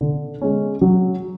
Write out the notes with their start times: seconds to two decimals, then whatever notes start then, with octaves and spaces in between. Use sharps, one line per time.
0.01 D3
0.41 G#3 C#4
0.81 F#3